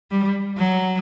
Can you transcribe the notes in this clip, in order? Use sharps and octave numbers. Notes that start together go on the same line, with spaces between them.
G3
F#3